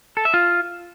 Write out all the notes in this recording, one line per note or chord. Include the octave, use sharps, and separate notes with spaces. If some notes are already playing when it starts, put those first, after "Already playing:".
A4
E5
F4